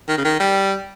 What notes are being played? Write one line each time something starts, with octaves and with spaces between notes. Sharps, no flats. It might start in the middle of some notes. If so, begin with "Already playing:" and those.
D#3
C#3
D#3
G3